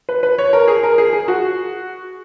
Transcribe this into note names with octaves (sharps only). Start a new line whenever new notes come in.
B4
B4
C#5
A#4
G#4
A#4
G#4
G#4
F#4